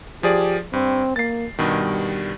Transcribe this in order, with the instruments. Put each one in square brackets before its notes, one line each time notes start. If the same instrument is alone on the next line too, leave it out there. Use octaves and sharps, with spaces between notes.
[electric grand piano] F3 G#4 D5 [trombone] G4
[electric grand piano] G2 [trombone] C4
[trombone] A#3 [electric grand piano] A6 C7
[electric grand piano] G2 B2 D#3 [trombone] G3